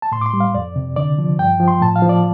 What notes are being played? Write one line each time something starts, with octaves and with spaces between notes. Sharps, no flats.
A5
A2 C6
D6
C6
G3
F5
F2 D5
C3
D3 D5
F3
G2 G5
F3
C6
A2 A5
F5
F3
D5